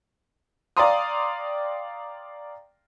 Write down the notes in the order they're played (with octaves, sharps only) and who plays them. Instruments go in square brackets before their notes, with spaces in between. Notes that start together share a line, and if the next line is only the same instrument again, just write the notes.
[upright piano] D5 F5 G5 A#5 C6 D#6